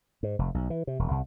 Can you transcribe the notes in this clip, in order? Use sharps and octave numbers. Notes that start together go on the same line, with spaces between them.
G#2
F1
B1
E3
C3
E1
C2